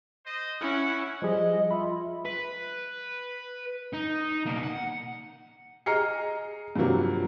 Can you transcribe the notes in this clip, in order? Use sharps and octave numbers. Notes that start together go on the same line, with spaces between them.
C5 D#5
C#4 E4 F#5
F3 G3 G#4 D#5
F4 E5 B5
B4
D#4
B2 A#3
F#5
G#4 D#5 A#5 F6 C7 C#7
G2 C3 F3 F#3 A#3